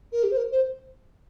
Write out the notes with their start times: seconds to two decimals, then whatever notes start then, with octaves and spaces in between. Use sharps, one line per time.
0.12 A#4
0.23 G4
0.31 C5
0.37 A#4
0.52 C5